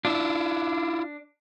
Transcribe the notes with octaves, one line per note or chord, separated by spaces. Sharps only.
D4 E4 F4